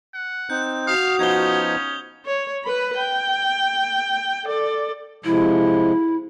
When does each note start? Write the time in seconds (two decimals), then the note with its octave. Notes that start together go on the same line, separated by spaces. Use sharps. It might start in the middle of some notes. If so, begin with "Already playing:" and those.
0.14 F#5
0.50 C4 D#4 G6
0.87 F#4 F5 D#6 F7
1.19 F3 B3 C#4 D#4 G#6 G7
2.26 C#5
2.65 B4 B5
2.97 G5
4.45 A4 D5
5.25 C3 F3 G#3 E4